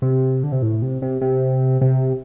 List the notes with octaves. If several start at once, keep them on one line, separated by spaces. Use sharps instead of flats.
C3
D3
C3
A2
C3
C3
C3
C3